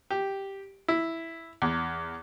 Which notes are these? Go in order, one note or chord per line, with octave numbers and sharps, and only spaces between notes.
G4
E4
E2